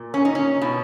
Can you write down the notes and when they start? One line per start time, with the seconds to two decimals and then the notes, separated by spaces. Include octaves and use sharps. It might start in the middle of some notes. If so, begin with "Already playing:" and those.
Already playing: A#2
0.14 C#4
0.25 D#4
0.35 C#4
0.62 B2